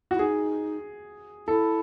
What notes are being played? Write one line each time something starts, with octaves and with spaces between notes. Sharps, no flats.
E4 F#4
D#4 G#4
E4 A4